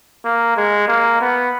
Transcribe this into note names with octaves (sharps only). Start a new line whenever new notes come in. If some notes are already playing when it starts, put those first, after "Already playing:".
A#3
G#3
A#3
B3